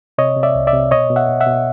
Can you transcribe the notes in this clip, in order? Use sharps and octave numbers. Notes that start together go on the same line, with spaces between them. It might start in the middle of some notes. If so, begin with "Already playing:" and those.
C3 C#5 D#5
C3
D5 E5
C2
D5 E5
C3
B2 C#5 D#5
B2
E5 F#5
B2
E5 F#5
B2